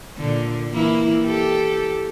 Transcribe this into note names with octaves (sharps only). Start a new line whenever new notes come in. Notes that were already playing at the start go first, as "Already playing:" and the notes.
A#2 D3
E3 A#3 E4
G4 A4